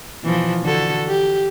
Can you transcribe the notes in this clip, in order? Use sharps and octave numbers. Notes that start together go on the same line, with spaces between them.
B2 E3 F3
D3 F#4 A4
G4